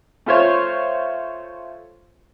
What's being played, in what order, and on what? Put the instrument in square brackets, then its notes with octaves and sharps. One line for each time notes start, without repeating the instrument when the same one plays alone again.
[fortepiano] A3 F4 C5 C#5